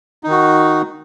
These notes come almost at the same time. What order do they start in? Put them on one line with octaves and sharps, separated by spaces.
D#4 D#3 F#4